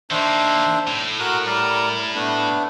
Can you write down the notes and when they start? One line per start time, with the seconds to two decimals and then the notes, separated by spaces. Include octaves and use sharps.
0.11 D#3 A#3 D4 C5 E5
0.87 A2
1.20 F#4 A#4 F#6
1.46 G3 A#4 D5
2.15 A3 B3 D4